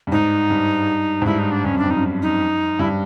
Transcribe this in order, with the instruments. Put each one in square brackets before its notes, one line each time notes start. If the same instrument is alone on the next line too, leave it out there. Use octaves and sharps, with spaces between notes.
[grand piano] G2
[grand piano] G#2 [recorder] D#4
[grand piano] G2
G#2
[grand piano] G2 [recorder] E4
[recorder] D#4
D4
[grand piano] G2 [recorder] C#4
[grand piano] F#2
[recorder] D4
[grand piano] F2
[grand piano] F#2 [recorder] D#4
[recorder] D#4
[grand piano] G2 [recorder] E4